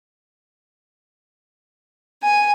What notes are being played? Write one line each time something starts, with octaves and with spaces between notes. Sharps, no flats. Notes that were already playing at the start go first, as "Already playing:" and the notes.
G#5